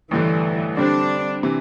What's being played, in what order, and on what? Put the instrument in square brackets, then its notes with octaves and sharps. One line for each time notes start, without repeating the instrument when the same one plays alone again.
[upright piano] A1 G2 D3 A3 [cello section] E3
[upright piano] D3 G3 C4 [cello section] D4
[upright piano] C3 E3